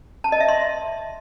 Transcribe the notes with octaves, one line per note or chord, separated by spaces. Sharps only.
A5
D#5
E5
C6